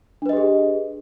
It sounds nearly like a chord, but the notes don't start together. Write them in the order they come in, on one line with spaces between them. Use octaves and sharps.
D4 B4 D#5 G4 G#4